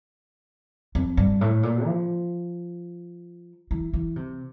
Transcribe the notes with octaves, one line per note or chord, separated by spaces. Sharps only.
F2
G2
A2
A#2
F3
E3
E3
C3